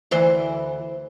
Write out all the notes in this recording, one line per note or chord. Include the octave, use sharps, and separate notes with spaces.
D2 E3 C5